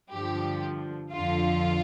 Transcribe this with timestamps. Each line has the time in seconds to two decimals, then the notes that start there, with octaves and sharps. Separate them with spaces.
0.11 G2 D3 F3 G4
1.13 F2 D3 F3 F4